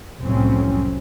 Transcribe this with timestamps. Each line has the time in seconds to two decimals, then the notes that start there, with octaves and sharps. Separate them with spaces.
0.22 C2 F2 A2 F#3 C4 C#4